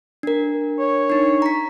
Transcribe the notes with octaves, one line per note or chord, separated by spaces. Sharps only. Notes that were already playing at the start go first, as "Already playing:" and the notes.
D4 A#4
C#5
D4 D#4
A#5 B6